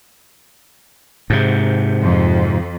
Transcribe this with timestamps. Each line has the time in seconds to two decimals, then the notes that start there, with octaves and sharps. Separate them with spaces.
1.30 G#2 C3
2.01 F2